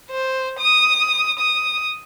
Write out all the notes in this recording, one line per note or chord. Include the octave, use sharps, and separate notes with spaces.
C5
D#6
D#6